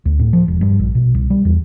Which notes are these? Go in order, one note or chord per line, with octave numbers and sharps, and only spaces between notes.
D2
A2
F3
E1
G2
A#1
B2
C2
G3
E2